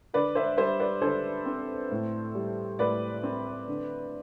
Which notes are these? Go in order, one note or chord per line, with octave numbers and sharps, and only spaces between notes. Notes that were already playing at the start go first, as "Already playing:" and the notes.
D3 B4 D5
C5 E5
G3 C5 E5
B4 D5
D3 A4 C5
C4
A2
G3
A2 B4 D5
C4
D3